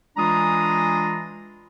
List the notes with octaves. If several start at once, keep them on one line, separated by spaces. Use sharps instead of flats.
E3 G#3 D4 F4 A#5 D#6